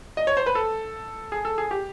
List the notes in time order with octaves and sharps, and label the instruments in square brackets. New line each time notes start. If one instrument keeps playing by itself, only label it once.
[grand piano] D#5
C#5
C5
B4
A4
G#4
A4
G#4
G4